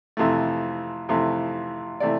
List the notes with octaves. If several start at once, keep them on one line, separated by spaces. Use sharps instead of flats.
F2 C3 E3 A3
F2 C3 E3 A3
C3 E3 A3 D5